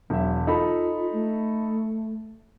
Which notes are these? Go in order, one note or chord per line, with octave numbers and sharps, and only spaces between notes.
E1 F#3 E5
D#4 F4 A4 B5
A3